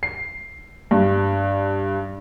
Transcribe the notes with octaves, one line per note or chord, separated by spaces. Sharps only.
C7
G2